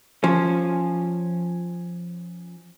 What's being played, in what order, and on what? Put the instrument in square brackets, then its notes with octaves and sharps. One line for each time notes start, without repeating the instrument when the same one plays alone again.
[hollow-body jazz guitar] F3 C#4